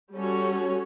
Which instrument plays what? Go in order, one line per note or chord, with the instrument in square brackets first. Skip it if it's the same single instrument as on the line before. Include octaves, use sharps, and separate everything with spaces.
[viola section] G3 C#4 F#4 A4 C#5